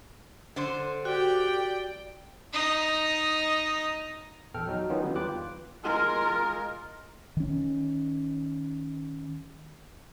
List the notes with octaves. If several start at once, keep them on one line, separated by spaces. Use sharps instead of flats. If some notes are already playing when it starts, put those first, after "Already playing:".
D3 C5
F#4 G4 D5 G5
D#4 D#5
A#1 E2 A4 G5 F6
F#3 D#4 F#4
D#3 F#3 B3 C#4 D#4 F4
D3 E3 G3
E2 F4 B4 G5 D6 F#6
G#3 F4 A#4
D#3 C#4